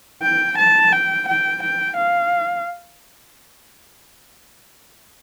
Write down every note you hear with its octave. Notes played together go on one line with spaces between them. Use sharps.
G5
A5
G5
G5
G5
F5